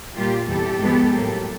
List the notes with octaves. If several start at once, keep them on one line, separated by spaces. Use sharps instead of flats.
A#2 G3 A#3 F4 G4
E2 C3 E3 G3 G4 A4
G#2 F3 G#3 B3
A2 F#3 A#3